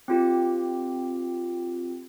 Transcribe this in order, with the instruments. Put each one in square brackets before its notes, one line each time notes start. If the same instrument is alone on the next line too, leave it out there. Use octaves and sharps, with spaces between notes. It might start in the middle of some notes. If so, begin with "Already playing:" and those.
[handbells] C4 F4 G4